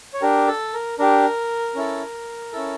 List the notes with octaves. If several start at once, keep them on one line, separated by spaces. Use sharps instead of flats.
C#5
D4 G4 A#4
A4
A#4
D4 G4 A#4
C#4 E4 A4
C#4 E4 A4